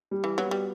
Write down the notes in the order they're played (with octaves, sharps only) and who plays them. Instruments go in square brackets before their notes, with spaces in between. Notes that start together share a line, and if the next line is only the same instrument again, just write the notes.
[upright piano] G3
[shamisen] E3
[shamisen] F#3 [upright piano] B3 F#4 B4
[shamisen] G3